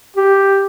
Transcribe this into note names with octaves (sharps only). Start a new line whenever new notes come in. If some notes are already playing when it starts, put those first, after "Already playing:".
G4